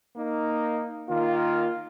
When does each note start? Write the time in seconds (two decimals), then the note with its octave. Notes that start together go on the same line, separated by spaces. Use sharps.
0.16 A#3 D#4
1.09 D#3 A#3 F4